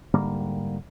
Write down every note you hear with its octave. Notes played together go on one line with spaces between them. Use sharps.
G#2 D3 G3 A#3